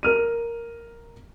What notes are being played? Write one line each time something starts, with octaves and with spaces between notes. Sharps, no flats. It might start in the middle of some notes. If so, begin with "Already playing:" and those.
A#4 F6 D#7